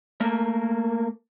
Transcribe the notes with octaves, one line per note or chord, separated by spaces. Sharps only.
A3 A#3 A#4